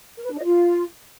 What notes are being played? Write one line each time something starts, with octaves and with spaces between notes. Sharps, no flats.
A#4
B4
D4
D#5
F4